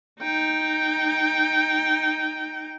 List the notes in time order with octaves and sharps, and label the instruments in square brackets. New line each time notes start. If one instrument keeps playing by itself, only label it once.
[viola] D#4 G5